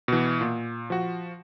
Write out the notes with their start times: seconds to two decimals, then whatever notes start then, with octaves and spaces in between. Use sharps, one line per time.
0.08 B2 E3
0.41 A#2
0.90 F3 F#4